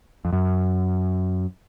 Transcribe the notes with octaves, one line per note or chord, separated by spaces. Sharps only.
F2
F#2